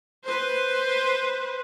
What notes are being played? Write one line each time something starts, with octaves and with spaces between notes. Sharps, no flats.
B4 C5